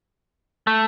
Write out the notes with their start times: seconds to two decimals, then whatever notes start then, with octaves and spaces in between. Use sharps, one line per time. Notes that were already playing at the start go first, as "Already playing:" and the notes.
0.67 A3